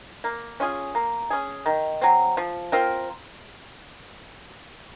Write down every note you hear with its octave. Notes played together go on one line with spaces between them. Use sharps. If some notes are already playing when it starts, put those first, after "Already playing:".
A#3
C#4 F4 G#4
A#3
C#4 G#4
D#3
F#3 C4
F3
C4 F4 A#4